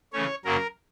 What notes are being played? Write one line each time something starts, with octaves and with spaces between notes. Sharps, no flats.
C#3 E3 A3 C#4 C#5
F#2 C#3 F#3 A#3 A#4